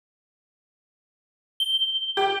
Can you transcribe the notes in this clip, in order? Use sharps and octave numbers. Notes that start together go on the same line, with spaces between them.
G7
G4